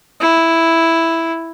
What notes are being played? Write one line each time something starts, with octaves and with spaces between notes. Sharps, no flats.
E4